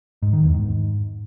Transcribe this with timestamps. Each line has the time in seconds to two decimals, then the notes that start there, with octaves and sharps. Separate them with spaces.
0.22 G#2
0.33 D#3
0.43 E2
0.54 G#2